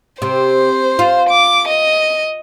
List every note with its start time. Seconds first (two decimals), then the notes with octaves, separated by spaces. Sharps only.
0.22 C3 C5
0.99 F4
1.30 D6
1.68 D#5